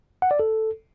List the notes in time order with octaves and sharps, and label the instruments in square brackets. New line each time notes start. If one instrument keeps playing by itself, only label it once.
[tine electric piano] F#5
D5
A4